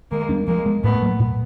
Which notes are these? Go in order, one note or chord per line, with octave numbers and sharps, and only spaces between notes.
D#3 G#3 A#3
G3 B3 D4
F3 G#3 A#3
G#3 B3
A2 A3 B3
F#3 A#3
A#2